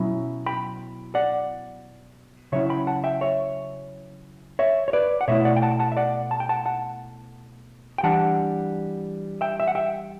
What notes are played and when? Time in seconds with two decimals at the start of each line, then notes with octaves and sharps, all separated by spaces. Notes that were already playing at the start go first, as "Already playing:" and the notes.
Already playing: B2 F#3 C#4 E4 E5
0.46 G5 B5
1.15 D5 F#5
2.52 C#3 F#3 C#4 E4 C#5 E5
2.70 G5 B5
2.87 F#5 A5
3.04 E5 G5
3.21 C#5 E5
4.59 C#5 E5
4.88 C#5
4.93 B4 D5
5.21 F#5
5.28 B2 A3 E4 C#5 E5
5.45 D5 F#5
5.56 G5
5.62 F#5 A5
5.79 F#5 A5
5.92 E5
5.97 D5 F#5
6.31 A5
6.40 G5
6.49 F#5 A5
6.66 F#5 A5
7.98 G5
8.03 E3 G3 D4 F#5 A5
9.41 E5 G5
9.60 E5
9.68 F#5
9.75 E5 G5